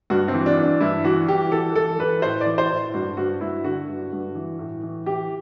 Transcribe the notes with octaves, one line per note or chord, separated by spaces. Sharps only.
G2 F#4
C4
E3
D4
E3
D4
G2 E4
E3 F#4
E3 G4
E3 A4
E3 A4
E3 B4
A2 C5
D5
E3
C5
A2
G2 F#4
G2 F#4
G2 E4
D3 F#4
G2
G2
E3
A2
E3
E3 G4